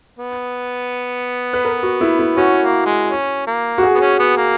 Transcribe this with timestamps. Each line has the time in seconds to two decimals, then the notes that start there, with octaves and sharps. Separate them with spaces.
0.18 B3
1.53 B4
1.65 A#4
1.83 F#4
2.01 E4
2.19 E4
2.37 C#4 F#4
2.61 A#3
2.85 G#3
3.09 C#4
3.47 A#3
3.78 F#4
3.83 G#4
3.95 B3
4.00 C#4
4.19 B3
4.37 A#3